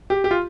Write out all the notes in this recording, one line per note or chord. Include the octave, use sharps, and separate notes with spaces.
G4
G4
F4